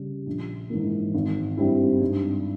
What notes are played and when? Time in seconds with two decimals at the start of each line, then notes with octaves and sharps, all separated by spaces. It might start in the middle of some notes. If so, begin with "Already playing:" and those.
Already playing: C#3 G3
0.26 A#1
0.70 G#2 E3 A#3
1.14 G#1
1.57 G2 G3 C4 E4
2.02 G2